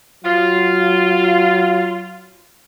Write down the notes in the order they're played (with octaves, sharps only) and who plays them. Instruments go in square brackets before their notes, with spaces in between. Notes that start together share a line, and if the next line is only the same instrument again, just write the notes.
[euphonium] F#3 [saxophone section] F4